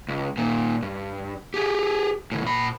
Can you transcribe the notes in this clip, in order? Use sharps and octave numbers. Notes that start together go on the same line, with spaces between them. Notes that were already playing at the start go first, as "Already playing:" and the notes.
C#2
A#2 D#3
G2
G4 G#4
A2 D3
A#2 B5